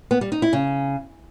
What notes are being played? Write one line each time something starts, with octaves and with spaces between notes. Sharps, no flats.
B3
G3
D#4
E4
C#3